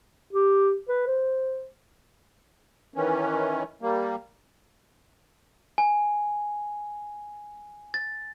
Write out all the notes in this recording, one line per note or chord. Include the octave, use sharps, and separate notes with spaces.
G4
B4
C5
D#3 E3 C#4
G3 A#3
G#5
A6